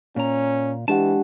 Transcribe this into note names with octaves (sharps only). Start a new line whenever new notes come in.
A#2 C#4 A#5
E3 G#3 D4 G4 F#5 A5